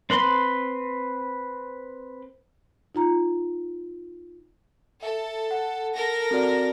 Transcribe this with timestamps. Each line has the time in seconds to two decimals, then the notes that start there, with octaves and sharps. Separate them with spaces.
0.10 C4 B4 C6
2.95 D#4 F4 A#5
5.03 A4 E5
5.51 F#5
5.94 A4 A#4 A#6
6.31 C4 F#4 D5